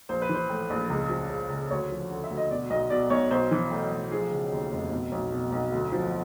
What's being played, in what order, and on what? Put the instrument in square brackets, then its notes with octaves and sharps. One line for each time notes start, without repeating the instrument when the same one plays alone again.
[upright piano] A#1 C5
B4
E3
C5
A2
A#1
C#2
F3
C#3
C#2
D2 C#5
F3
D3
E5
D2
D#5
B2 D5
B1 D#5
B2 D5
B1 C#5
B1 C5
E3
A2
B1
F3 G#4
C#3
D#2
F1
B2
B1
B2
B1
D2
F3